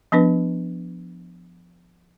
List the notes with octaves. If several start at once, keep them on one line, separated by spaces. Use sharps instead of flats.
F3 B3 D4 B4